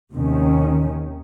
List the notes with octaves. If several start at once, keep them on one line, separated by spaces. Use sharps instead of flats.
D#2 C3 D#3 C#4